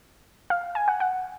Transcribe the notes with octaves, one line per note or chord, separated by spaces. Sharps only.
F5
G#5
F#5
F#5